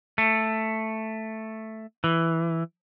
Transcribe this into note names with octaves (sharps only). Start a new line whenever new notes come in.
A3
E3